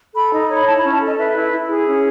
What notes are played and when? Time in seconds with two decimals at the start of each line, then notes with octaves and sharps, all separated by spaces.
0.14 A4 B5
0.32 D#4
0.49 C#5
0.55 B5
0.66 E4 A5
0.79 B5
0.84 C#4
0.92 A5
1.00 A4
1.05 D#5
1.17 B4 E5
1.35 E4
1.52 E4
1.69 G#4
1.87 C#4